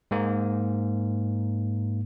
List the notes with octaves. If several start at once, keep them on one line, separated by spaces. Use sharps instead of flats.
G#2 A#3